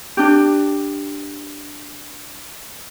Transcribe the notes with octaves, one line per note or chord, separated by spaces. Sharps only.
D4 G4